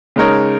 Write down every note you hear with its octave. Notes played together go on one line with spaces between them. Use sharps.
C#3 G#3 D#4 A#4 C#5